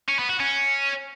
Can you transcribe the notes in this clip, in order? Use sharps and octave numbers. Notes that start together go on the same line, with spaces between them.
C#4
B3
F#4
C#4